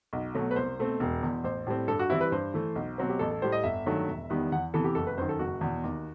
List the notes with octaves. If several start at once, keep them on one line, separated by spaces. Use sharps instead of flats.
B1
B2 F#3 A3
B4
C2 C5
B2 A3 C4
E1
E2 B2
A1 C5
A2 G3 C4
G2 A4
F#4
E3 G3 C4 E4
B4
G2 C5
E3 A3
B1
B2 F#3 C4
G4
A1 A4
A4
A2 G3 C5
D#5
G1 E5
G2 D#3 F#3 A3
E1
E2 D#3 G3 B3
E2 F#5
C3 E3 B3 A4
G4
F#1 A4
B4
F#2 D#3 C5
A4
F#1 F#4
E2 B2
D#2